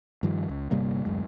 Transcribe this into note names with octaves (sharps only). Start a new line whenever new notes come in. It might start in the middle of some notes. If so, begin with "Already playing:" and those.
G2 D#3 F3
C#2
G1 C3 G3 A#3
D1 F#2 G#3